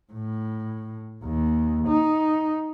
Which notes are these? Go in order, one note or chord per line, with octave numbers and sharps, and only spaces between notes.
A2
D#2
D#4